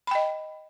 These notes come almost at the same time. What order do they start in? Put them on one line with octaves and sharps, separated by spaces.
B5 G5 D#5